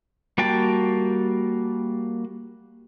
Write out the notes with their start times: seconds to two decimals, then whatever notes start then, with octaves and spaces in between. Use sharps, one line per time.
0.38 G3 A#3 F#4 G5 A5